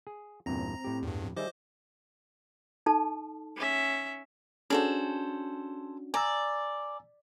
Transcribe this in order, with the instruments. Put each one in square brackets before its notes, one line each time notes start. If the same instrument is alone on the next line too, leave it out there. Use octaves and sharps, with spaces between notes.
[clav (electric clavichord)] G#4
[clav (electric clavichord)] E2 G2 A#2 [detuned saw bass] C4 [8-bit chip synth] A#5 A#6
[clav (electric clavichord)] A2 G4
[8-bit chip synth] E2 G2
[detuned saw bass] F2
[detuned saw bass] D#3 [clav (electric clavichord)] G3 G#4 E5 [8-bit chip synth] C5 D#5 D6
[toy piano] D#4 A4 A5
[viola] C#4 E5
[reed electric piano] C#4 D4 F#4 [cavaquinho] G#4 A4 C5
[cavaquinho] D5 [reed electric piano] G#5 A#5 E6